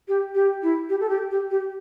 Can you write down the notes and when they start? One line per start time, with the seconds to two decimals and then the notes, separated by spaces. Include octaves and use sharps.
0.08 G4
0.34 G4
0.62 E4
0.89 G4
1.00 A4
1.09 G4
1.31 G4
1.50 G4